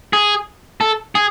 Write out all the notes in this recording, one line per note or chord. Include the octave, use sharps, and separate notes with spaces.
G#4
A4
G#4